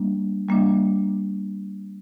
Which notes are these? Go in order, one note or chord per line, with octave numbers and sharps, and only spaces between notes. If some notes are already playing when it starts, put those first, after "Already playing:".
Already playing: G3 A#3 D4
G3 A#3 D4